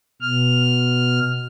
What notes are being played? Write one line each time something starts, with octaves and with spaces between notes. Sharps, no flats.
B2 F6